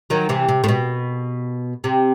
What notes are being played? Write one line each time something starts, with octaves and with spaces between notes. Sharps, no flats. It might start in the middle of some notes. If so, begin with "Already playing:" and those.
D#3 F#3
C3 E3
C3
A2
B2
C3